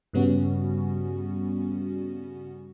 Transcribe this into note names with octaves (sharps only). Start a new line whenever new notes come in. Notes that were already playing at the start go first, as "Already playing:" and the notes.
G2 C#3 G3 B3 C#4 F#4